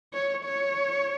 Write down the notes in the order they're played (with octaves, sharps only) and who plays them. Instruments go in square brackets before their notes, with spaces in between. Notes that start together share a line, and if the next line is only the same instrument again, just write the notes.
[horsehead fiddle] C#5
C#5